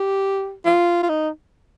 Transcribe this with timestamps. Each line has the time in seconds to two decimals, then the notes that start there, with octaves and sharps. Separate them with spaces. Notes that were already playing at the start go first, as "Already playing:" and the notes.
Already playing: G4
0.65 F4
1.03 F4
1.09 D#4